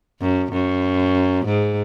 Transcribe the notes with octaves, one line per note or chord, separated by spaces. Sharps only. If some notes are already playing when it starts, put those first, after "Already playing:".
F#2
F#2
G#2